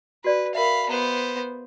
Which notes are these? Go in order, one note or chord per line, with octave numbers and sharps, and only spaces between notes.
F#4 B4 D5
A#4 E5 F5 B5
B3 C5 A#5